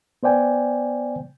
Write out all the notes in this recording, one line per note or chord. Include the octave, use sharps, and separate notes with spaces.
B3 C5 D5 G5 G#5